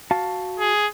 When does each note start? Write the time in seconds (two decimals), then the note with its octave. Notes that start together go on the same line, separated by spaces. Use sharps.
0.11 F#4 F5 A5
0.59 G#4